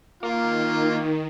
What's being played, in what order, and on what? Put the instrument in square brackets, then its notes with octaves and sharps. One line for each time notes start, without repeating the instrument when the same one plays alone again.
[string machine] D#3 [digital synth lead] A#3 [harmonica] F4